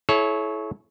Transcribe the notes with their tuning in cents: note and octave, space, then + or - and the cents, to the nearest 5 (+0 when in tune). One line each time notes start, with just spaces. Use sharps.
E4 +0 A4 -45 C#5 +0